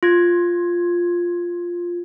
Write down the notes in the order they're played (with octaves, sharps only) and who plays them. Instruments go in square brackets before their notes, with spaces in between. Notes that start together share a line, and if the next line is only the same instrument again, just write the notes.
[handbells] F4 G#6